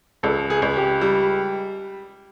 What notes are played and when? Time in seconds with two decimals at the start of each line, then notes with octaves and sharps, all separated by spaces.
0.23 C#2 A4
0.50 G#4
0.62 C#2
0.76 G4
1.01 G3